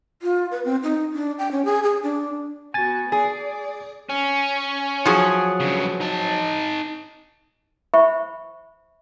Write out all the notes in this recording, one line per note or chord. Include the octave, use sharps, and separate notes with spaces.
F4
B4
C4
D#4
D4
G5
C#4
G#4
G#4
D4
B3 F#4 G#5 A6
G#4 D5
C#4
F3 F#3 G#4
G2 C#3
D#4 A5
C5 E5 B5 C#6